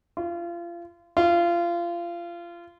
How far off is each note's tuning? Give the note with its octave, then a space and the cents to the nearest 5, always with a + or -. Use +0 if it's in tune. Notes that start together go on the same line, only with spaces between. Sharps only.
F4 -30
F4 -25